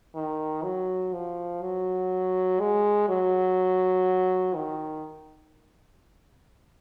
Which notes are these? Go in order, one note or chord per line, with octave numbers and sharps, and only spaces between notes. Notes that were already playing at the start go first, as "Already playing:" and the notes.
D#3
F#3
F3
F#3
G#3
F#3
D#3